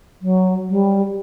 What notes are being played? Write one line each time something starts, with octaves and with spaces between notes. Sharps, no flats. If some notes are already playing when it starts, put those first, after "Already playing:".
F#3
G3